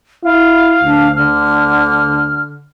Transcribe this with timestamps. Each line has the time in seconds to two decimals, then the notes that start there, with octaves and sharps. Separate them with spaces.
0.24 E4 F5
0.84 D2 D4
1.16 D3 F6